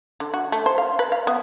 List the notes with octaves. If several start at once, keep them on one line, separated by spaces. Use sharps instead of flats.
D3
F#4
A3
C5
F5
B4
F5
B3